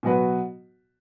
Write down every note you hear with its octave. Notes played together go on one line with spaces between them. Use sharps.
B2 F#3 B3 F#4 B4